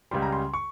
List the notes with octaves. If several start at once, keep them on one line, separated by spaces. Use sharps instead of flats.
C#2 C#3 G3 C6
A#5
C6
C#6